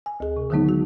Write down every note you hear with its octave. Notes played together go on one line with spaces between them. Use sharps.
G#5
D2 G#4
C3
D3 D#3 F#3 G#3 B3 D#4
F#4